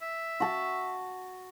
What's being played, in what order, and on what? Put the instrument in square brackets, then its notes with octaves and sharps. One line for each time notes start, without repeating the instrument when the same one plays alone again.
[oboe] E5
[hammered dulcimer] F#4 A5